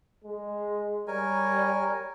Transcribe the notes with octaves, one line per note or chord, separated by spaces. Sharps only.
G#3
G3 A#4 C#5 G#5